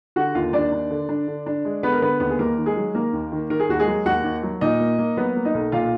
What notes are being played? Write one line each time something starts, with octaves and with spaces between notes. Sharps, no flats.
D3 F#4 F#5
D#2 F4 F5
D#2 D4 D5
D4
D3
D4
D3
D4
G#3
D3 B3 B4
A#4
D3 B3 B4
D#2 B3 B4
G#4
D#2 A#3 A#4
D#3
G#3 G#4
F#3
D#3 A#3 A#4
D#2
D#3
D#3 A#4
G#4
D#2 F#4
G#3 G#4
F#3
D#2 F#4 F#5
D#2
F#3
A#2 D#4 D#5
A#3
A#3
F#3 B3 B4
A#3
D#4 D#5
B1
A#2 F4 F5